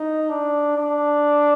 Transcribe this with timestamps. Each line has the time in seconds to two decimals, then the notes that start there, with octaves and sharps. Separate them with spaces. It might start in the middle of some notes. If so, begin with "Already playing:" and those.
Already playing: D#4
0.30 D4
0.77 D4